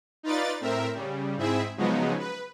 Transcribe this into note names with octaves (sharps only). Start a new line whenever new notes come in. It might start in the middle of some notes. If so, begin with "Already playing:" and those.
D#4 F4 B4 D5 A6
A2 C4 A#4 E5
C#3 G3
G#2 C4 E4 G#4 E5
C#3 F3 F#3 G#3 B3 D#4
B4